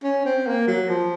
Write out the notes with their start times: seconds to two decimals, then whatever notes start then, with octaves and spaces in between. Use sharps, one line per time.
0.03 C#4
0.25 C4
0.47 A#3
0.67 F#3
0.89 F3